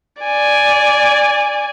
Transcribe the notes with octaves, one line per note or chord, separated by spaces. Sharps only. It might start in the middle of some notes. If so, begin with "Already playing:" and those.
D5 G#5